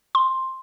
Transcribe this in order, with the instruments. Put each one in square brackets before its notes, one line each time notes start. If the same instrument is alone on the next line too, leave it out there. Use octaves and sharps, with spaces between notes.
[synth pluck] C6